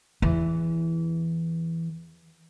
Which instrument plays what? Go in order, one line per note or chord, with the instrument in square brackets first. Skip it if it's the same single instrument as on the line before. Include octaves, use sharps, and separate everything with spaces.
[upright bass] E2 E3